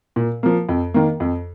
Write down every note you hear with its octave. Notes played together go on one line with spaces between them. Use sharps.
A#2
F3 A#3
F2
D#3 A#3
F2